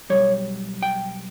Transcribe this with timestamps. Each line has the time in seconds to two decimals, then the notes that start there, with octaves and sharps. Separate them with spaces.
0.10 B1 B2 G3 C#5
0.83 G5